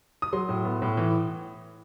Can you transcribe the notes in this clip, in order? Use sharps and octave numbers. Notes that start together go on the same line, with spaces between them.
D#6
F#3 C6
A2
B3
A2
E3